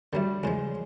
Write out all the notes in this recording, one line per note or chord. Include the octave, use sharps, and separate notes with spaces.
D3 F#3 G3 A3
E2 C#3 F3 G#3